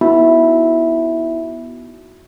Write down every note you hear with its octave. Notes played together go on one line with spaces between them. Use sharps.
B3 D#4 E4 F#4 E5 B5